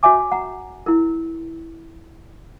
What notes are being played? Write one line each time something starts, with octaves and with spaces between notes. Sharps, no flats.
F#4 C#5 E5 G#5 D6
F#5 A#5
E4 A#4